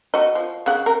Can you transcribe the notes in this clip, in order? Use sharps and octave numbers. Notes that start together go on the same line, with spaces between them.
F#4 D#5
F3
C#3 F#5
A#4